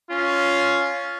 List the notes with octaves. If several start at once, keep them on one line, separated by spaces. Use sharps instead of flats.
C#4 F4